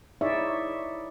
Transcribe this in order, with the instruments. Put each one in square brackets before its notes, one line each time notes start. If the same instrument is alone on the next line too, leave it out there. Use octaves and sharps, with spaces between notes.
[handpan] D#4 E4 G#4 C#5 D5 E5